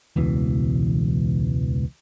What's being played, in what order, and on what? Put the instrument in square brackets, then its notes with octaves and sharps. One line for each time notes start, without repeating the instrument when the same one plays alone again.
[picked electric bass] E1 C#2 B2 E3